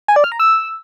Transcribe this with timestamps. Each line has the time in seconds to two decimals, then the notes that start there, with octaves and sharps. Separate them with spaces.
0.08 G#5
0.16 D5
0.24 F6
0.32 A#5
0.40 E6